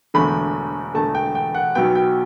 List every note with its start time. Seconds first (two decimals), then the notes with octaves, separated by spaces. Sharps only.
0.14 E1 E2 D3 A3 B5
0.94 E1 E2 D3 A3 A5
1.15 G5
1.35 G5
1.55 F#5
1.75 B1 B2 F#3 B3 G5
1.95 G5